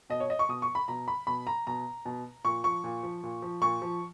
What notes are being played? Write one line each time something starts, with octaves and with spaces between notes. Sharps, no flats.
B2 D#5
C#5
D#5
C#6
B2 D#6
C#6
B5
B2 A#5
B5
B2 B5
A#5
B2 A#5
B2
A#2 C#6
F3 C#6
A#2
F3
A#2
F3
A#2 C#6
F3